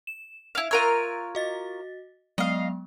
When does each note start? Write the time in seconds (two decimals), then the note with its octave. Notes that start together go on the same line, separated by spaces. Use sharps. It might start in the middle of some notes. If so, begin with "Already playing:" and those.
0.07 E7
0.55 E4 F5
0.71 F4 A#4 C#5 E6 F#6 A6
1.35 F#4 D#5 A6
2.38 F#3 G#3 B3 D#5 F5